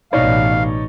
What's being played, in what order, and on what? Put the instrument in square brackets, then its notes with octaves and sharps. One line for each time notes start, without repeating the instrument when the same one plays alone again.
[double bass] A1 B2 [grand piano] D#4 C#5 D5 [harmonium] F5